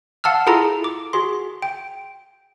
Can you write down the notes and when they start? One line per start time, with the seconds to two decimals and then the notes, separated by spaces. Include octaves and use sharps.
0.24 F5 F#5 A5 E6 F6
0.47 E4 F4 G#4 A4 A5 A#5
0.84 D6
1.13 F#4 G#4 C6
1.62 G5